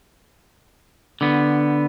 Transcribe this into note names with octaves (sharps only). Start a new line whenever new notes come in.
D3 B3